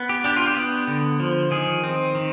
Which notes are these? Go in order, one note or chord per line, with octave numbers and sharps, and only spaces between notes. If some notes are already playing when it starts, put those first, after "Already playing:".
Already playing: B3
G4
D4 G4
F4
G4
B3
D3
F3
D#3 G#4
C4
D#3